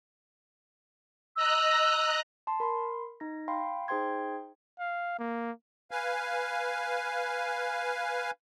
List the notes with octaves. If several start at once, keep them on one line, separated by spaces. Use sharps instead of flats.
D#5 A#5 E6 F#6
A5 C6
A#4 B5 C6
D#4 A#6
F5 G5 B5 C6
D#4 G#4 C5 G5 C6 G#6
F5
A#3
B4 F5 G#5